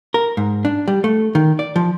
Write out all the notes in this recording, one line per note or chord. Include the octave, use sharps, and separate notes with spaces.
A#4
G#2
D4
G3
A3
D#3
D5
F3